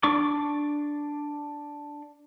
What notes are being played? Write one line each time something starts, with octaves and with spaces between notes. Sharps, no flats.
D4 D5 C#6 D6